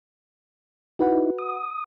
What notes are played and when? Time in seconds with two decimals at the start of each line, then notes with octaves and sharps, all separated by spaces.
0.99 D#4 E4 F#4 B4 F#5
1.39 D#6